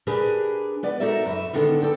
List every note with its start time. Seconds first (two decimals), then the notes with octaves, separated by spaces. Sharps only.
0.07 D4 G4 G#4 A#4 B4
0.83 B3 B4 D5
1.00 D#4 F#4 A4 A#4 D5 E5
1.25 F#2 B4 E5
1.53 D3 D#3 B3 D4 A4
1.82 A4 D5 G5